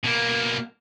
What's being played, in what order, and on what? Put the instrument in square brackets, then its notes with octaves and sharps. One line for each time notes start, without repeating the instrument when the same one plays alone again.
[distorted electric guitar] B2 A#3